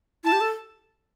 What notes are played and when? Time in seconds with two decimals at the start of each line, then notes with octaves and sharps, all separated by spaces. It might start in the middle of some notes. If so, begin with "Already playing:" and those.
0.24 E4 A5
0.32 G4
0.41 A4